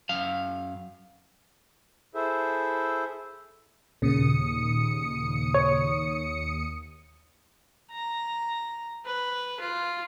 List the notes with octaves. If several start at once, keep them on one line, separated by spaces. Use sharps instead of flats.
F#2 F5
E4 G#4 A4 C5 E5
D#2 A#2 C#3 D#6 C#7
C#5
A#5
B4
F4